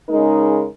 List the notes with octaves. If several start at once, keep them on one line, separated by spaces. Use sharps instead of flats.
C#3 G#3 D#4 A#4